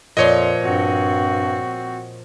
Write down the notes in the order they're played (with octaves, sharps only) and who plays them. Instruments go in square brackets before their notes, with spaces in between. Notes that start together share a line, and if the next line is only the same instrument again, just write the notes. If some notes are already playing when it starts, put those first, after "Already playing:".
[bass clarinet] F2 [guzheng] A#2 F3 C6 [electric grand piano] C#5 D#5
[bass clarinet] G2 [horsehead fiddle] C4 F#4